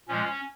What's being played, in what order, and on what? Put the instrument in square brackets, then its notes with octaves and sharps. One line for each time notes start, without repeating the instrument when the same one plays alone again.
[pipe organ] A#2 F3 G#3 C#4